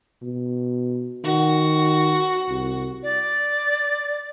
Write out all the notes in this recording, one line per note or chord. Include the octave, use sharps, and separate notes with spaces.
B2
D#3 F#4
C2
D5